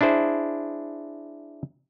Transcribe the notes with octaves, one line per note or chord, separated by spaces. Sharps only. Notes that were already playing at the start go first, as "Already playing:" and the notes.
D4 E4 G#4 C5